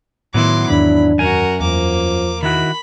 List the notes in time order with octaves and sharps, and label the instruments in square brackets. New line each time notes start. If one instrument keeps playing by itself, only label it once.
[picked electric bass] A2 D#3 [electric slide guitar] F#3 B3 E4 [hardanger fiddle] C6 D6
[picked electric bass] E2 G#2 D#3 [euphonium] D4 [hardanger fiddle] B5
[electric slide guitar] F#2 G#5 [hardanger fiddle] F#4 A#4
[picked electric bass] E2 [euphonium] F3 [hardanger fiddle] A#3 D6
[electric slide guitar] D#3 E4 F#4 [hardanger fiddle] B5